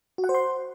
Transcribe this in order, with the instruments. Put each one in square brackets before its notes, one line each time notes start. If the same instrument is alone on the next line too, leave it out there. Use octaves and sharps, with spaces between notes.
[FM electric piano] F#4
F#5
C5
C6